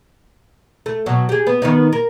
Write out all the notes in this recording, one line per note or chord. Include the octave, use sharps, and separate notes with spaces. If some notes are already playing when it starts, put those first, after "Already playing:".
A3
B2 F#3
G4 G#4
B3
D#3 B3 D#4
A#4